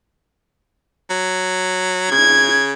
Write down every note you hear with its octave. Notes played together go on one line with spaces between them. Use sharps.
F#3
C#3 G#6